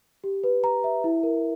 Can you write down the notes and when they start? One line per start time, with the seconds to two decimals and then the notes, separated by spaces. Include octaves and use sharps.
0.24 G4
0.44 B4
0.64 A#5
0.84 E5
1.04 E4
1.23 A#4